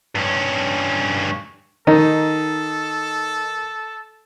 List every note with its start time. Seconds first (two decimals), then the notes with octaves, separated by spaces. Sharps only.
0.15 G2 C#4
1.87 D#3 D#4 A4